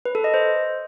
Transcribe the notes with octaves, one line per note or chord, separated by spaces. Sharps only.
B4
A4
D#5
C5